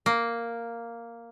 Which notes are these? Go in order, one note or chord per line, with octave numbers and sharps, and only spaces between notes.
A#3